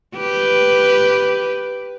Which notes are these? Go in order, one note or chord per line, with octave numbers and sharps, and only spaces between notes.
G4 B4